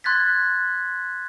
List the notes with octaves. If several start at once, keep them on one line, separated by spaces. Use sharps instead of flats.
C6 F#6 G#6 A6 B6